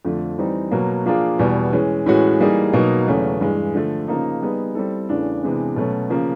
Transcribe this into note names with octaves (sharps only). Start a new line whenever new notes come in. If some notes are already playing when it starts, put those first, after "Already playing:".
F2 D3 F3 A3
E3 G3 C4 D#4
B2 F#3 A#3
F3 A#3 D4 F4 G#4
E2 B2 G3
E3 G#3 C#4
A2 E3 G#3 C#4 F#4
E3 G3 A#3 D#4 G#4
B2 F#3 A#3 D#4
E2 C#3 F#3 A3 C#4
G2 E3 G#3
D3 F3 A3
C#3 F3 A#3 D#4
G3 B3 D#4 G#4
G3 C4 E4 A4
E2 C#3 E3 A3 D4
C3 E3 G#3 B3 D4
B2 F#3 A3 C#4
C#3 F3 A#3